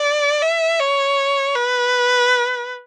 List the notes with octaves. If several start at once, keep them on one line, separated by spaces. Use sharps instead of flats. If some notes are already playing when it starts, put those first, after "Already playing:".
Already playing: D5
E5
C#5
B4